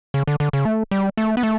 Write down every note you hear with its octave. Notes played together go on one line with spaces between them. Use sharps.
C#3
D3
D3
C#3
A3
G3
A3
B3
A3